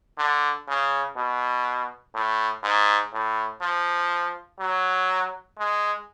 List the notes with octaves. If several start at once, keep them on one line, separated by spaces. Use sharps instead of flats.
D3
C#3
B2
A2
G#2
A2
F3
F#3
G#3